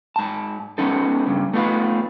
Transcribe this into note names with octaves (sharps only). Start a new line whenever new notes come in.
G#2 A5
G#3 A3 B3 C#4 D#4 A4
G2 C#3
A3 B3 D#4 F4 B4